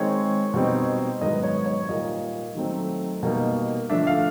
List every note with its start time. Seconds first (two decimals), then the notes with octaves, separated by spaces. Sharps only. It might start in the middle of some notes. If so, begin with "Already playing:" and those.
Already playing: D#3 G#3 C4 C#5
0.54 B2 G3 C4 D#4
1.21 G#2 D#3 F#3 B3 D#5
1.43 C#5
1.66 C#5
1.89 A#2 G3 A#3 D#4 D#5
2.55 D#3 F#3 A3 C4 D#4
3.23 B2 G3 A#3 D#4
3.90 D3 F3 A3 D4 E5
4.07 F5